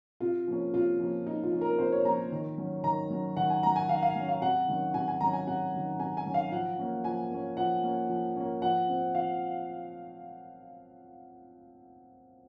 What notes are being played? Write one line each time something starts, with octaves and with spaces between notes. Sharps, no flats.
C3 F4
F3 A#3 C#4
C3 F4
F3 A#3 C#4
C3 D#4
F4
F3 A#3 C#4
A#4
C3 C5
C#5
F3 A#3 C#4 A#5
D#3
F#3 C#4
D#3 A#5
F#3 C#4
D#3 F#5
G#5
F#3 C#4 A#5
G#5
D#3 F5
F5
F#3 C#4
F5
C3 F#5
D#3 F#3 C#4
C3 G#5
G#5
D#3 F#3 C#4 A#5
G#5
C3 F#5
D#3 F#3 C#4
C3 G#5
G#5
D#3 F#3 C#4
F5
F3 F#5
A#3 C#4
F3 G#5
A#3 C#4
F3 F#5
A#3 C#4
F3
A#3 C#4
F3 F#5
C4
F3 F5